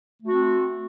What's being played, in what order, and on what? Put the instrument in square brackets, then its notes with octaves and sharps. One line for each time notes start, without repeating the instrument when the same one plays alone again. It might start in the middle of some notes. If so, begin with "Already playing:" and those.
[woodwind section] A3
F#4
C4